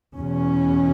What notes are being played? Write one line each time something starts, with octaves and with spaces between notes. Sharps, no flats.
E2 B2 C#4